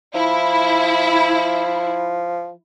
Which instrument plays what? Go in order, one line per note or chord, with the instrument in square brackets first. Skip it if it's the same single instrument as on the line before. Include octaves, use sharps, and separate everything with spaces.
[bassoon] F3 [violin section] E4